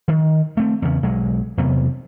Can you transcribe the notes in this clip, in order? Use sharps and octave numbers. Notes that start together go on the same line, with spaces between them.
D#3
A3 C4
E2 C#3
B1 F#3 G#3
E2 C3 F#3 B3